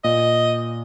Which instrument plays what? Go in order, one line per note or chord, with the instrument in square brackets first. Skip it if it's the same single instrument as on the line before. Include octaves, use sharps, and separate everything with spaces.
[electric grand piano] A#2 [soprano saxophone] D#5